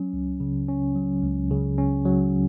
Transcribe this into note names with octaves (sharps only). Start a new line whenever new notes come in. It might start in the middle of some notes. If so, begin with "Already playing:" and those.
Already playing: F#3 C#4
C#2
C#3
C#4
F#3
C#2
C#3
C#4
F#3